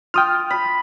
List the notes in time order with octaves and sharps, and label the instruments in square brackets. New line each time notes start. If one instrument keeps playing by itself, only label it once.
[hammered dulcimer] F4 [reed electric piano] G5 D#6 F6
[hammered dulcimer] B5